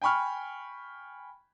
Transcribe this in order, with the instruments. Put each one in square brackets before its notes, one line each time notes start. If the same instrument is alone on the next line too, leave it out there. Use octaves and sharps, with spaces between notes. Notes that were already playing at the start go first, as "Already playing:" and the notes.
[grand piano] G5 G#5 B5 C#6 F6